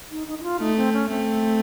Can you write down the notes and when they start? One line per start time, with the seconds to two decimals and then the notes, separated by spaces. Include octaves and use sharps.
0.11 D#4
0.27 D#4
0.39 D#4
0.43 F4
0.59 A3 D#4
0.77 C4
0.93 C#4
1.09 A3 C4